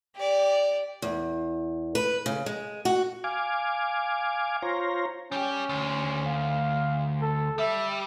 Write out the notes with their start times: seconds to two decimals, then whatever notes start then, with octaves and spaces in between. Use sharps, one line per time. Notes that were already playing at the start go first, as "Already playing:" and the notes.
0.15 G4 D5
1.02 E2
1.95 B4
2.26 C#3
2.46 G#3
2.85 F#4
3.24 F5 G#5 D6
4.62 F4 C5 C#5 A#5
5.32 G3 C#4 G4
5.69 D2
6.26 F5
7.22 A4
7.59 G3 E5